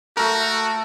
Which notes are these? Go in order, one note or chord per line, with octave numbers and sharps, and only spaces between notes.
A3 F#4 A#4